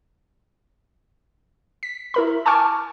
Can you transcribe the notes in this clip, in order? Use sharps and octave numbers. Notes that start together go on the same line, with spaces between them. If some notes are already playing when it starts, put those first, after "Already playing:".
B6
E4 A#4 B5
G#5 A5 C#6 D6 F6